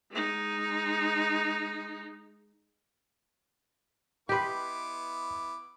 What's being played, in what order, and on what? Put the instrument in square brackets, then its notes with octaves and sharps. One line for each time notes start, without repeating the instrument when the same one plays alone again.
[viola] G#3 D#4
[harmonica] B3 E4 D6 [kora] G4 B4 [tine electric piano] D#5 C6